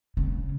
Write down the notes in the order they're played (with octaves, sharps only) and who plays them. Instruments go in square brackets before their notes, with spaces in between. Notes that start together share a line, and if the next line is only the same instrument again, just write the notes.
[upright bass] C#3